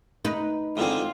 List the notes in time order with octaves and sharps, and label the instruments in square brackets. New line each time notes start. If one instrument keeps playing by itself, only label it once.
[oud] D#4 B4
[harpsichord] G#2 D3 C4 [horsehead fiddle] F4